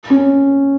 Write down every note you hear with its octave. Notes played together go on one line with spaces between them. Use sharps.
C#4